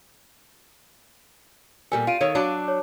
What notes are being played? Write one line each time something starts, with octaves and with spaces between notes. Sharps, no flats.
A#2 G3 A4 A#4 G#5
F4 F5 D7 D#7
D#3 A4 C#5
F#3 D4 A5
C#5